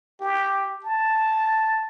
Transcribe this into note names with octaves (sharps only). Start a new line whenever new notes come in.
G4
A5